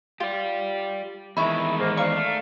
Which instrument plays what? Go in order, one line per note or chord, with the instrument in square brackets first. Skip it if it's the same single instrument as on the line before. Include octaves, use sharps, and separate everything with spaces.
[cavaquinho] F4 [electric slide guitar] G4 D5
[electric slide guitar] E2 D#3 G#3 [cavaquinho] E4 E5 [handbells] B5 C#6 G#6
[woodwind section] G#2 A#3
[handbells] D5 A#5 [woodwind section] F5 [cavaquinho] C#6
[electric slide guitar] A3